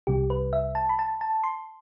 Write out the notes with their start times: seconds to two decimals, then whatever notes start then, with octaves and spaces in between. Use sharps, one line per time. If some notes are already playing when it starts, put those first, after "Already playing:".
0.07 C2 C3 G3 G4
0.30 B4
0.53 E5
0.75 A5
0.89 B5
0.99 A5
1.21 A5
1.44 C6